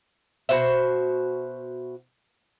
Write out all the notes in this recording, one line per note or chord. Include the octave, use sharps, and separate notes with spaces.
B2 F#4 C5 E5